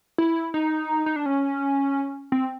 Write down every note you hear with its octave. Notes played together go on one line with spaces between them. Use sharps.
E4
D#4
D#4
D4
C#4
C4